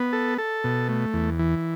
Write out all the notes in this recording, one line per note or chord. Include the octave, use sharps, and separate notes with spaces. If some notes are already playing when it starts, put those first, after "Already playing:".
Already playing: B3
A4
A4
B2
A3
E2
E3